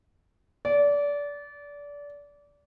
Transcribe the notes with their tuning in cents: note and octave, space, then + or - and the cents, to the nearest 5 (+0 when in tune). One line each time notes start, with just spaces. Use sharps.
D5 -25